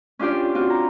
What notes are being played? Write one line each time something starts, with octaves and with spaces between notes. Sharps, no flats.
C#4 D4 F4 G4 D5
C4 F4 F#4
A#5